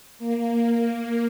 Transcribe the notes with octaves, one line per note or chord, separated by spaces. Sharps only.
A#3
A#3
A#3